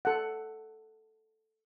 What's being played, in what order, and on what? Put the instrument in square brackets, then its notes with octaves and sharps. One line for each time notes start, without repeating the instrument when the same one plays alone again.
[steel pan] A4 F#5